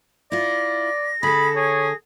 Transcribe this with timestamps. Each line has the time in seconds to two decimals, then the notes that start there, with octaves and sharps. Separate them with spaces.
0.32 E4 F4 D5 A#6
1.23 D3 G#4 A4 B5
1.56 G#4 C#5